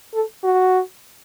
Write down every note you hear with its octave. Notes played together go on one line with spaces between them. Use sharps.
A4
F#4